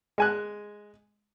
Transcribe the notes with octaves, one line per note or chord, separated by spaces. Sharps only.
G#3 G#5 F#6